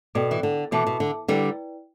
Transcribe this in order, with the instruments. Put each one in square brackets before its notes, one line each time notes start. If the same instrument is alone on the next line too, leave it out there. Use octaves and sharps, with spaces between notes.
[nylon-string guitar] B2 [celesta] A4 D5 G5
[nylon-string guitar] E3
D3
[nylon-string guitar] B2 E3 [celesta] A4 E5 A5 D6
[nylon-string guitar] B2
D3
[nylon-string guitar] D3 G3 [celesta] E4 B4 D5 G5